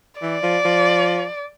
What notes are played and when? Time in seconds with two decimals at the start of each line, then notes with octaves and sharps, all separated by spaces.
0.21 E3 D5
0.43 F3
0.65 F3